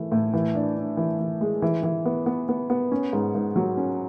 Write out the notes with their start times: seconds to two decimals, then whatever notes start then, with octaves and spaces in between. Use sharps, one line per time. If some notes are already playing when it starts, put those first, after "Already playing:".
Already playing: E3 A3
0.12 A2
0.33 E3
0.55 D4
0.77 D4
0.97 E3
1.19 E3
1.41 G#3
1.62 E3
1.83 E3
2.05 B3
2.26 B3
2.49 B3
2.70 B3
2.92 C#4
3.13 G#2
3.35 G#2
3.56 F#3
3.77 C#4